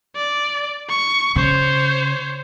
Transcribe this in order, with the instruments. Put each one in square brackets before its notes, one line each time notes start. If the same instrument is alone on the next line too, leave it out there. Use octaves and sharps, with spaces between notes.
[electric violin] D5
C#6
[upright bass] C#3 [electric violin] C5 C#5